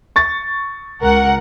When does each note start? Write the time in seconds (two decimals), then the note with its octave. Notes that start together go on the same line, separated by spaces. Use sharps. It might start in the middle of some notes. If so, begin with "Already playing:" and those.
0.16 C#6 A6
1.02 C#2 A#4 F#5